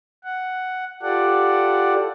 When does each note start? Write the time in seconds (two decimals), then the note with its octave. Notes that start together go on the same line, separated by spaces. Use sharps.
0.24 F#5
1.02 F4 G4 A4 D5 F#5